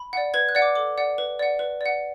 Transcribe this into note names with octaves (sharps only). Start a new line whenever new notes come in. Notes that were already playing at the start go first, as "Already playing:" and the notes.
Already playing: B5
D5 F#5
B4 G#6
F#6
D5 F#5
D6
A4 D6
D5 F#5
B4
D5 F#5
B4
D5 F#5